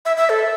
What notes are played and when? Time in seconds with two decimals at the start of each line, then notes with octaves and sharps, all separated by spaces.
0.05 E5
0.17 E5
0.29 A4